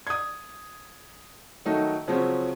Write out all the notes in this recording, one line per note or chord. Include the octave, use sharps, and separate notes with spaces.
D#6 G#6
D#3 F#3 A3 D#4
C#3 F3 F#3 C4 C#4